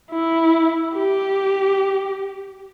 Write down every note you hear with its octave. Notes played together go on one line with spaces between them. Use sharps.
E4
G4